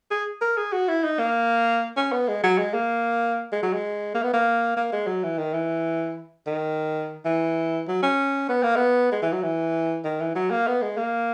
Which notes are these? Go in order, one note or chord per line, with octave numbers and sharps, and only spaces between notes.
G#4
A#4
G#4
F#4
E4
D#4
A#3
C#4
B3
G#3
F#3
G#3
A#3
G#3
F#3
G#3
A#3
B3
A#3
A#3
G#3
F#3
E3
D#3
E3
D#3
E3
F#3
C#4
B3
A#3
B3
G#3
E3
F#3
E3
D#3
E3
F#3
A#3
B3
G#3
A#3